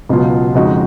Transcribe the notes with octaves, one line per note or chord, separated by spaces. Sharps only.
C#2 B2 F#3 B3 F4
F2 C#3 G#3 D#4 F#4